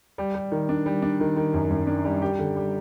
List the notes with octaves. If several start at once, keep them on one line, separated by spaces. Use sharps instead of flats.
G3
G3
D#3
D4
G3
D4
D#3
D#3
F#2
F#2
D4
G3
G4
D3
G3